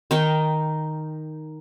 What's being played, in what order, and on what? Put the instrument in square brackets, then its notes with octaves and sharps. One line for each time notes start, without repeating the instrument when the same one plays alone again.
[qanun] D#3 D#4 G5